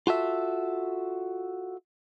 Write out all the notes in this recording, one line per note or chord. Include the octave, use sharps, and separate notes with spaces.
F4 F#4 A4 E5